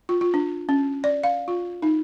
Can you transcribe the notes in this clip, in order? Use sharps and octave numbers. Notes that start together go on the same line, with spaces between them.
F4
F4
D4
C#4
D5
F5
F4
D#4